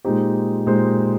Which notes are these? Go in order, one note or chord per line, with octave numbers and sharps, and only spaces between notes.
A#2 G#3 D#4 G4 C5
A#2 G#3 D#4 G4 C5